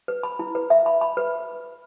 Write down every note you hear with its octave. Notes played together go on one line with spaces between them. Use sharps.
B4
B5
E4
B4
E5
B5
B5
B4